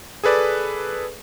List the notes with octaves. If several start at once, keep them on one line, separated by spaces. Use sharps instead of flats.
G#4 A4 B4 D5